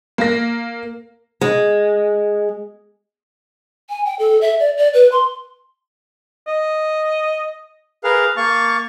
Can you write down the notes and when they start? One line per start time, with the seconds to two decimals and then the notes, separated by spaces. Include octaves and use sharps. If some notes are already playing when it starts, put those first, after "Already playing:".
0.18 A#3 A#6
1.41 G#3
3.90 G#5
4.06 G5
4.19 A4
4.41 E5
4.60 D5
4.77 D5
4.94 B4
5.12 C6
6.47 D#5
8.04 G#4 A#4 B4 F5
8.37 A#3 F5 A5 C#6